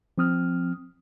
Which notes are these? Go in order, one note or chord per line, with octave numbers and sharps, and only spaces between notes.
F3 C4 D#6 F6